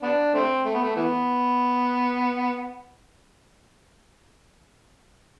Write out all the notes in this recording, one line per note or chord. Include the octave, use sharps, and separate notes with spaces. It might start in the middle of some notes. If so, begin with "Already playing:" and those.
B3 D4
A3 C4
A3
B3
A3
E3 B3